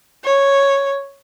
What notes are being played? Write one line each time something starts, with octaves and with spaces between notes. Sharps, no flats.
C#5